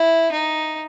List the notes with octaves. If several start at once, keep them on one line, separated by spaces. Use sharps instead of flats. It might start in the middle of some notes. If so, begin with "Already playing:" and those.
Already playing: E4
D#4